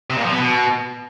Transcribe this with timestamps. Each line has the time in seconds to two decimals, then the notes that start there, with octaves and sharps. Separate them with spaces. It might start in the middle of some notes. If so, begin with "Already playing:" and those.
0.10 C3
0.17 A#2
0.24 F3
0.32 B3
0.39 B2